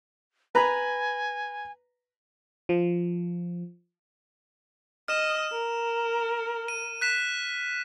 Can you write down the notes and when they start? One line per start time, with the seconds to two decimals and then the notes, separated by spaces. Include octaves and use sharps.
0.55 B4 G#5 A#5 B5
2.69 F3
5.08 D#5 F6 E7
5.52 A#4
6.68 D#7
7.01 F#6 B6 E7